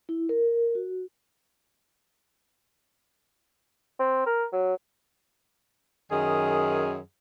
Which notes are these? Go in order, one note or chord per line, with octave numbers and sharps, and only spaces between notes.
E4
A#4
F#4
C4
A#4
F#3
F#2 D#3 G#4